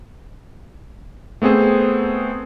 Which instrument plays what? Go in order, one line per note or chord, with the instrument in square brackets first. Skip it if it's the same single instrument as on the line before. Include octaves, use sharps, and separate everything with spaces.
[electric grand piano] A3 B3 C4 G#4 C5